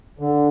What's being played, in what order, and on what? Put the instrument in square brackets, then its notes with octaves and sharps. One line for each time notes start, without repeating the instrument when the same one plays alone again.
[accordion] D3